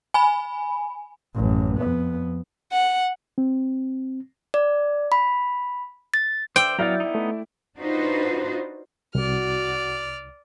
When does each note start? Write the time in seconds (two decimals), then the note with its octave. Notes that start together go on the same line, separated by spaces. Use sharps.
0.14 G#5 B5
1.35 A1 F#2
1.78 F2 B3
2.72 F#5
3.38 C4
4.54 D5
5.12 B5
6.14 A6
6.56 C5 D5 E5 G5
6.79 F#3 B3 E4 D5 E5 F5 A#5 A6
7.00 B3 D#4
7.15 A3
7.77 D4 D#4 F4 F#4 B4 C5
9.15 C2 F#4 D5 F6